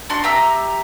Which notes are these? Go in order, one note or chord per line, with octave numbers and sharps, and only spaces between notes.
D4 F#4 C6
G4 E5 A#5 E6